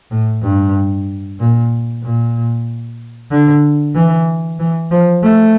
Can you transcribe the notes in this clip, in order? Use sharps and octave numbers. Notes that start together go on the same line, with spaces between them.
A2
G2
A#2
A#2
D3
E3
E3
F3
A3